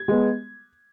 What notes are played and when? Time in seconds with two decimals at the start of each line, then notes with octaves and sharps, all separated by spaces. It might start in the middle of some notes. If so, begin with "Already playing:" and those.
Already playing: G#6
0.08 G#3 B3